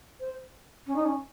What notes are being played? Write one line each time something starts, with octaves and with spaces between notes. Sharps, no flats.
C5
C#4
D#4
C#4